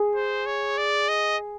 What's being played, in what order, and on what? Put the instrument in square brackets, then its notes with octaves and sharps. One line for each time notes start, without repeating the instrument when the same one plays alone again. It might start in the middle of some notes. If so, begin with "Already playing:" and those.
Already playing: [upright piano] G#4
[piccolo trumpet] C5
C#5
D5
D#5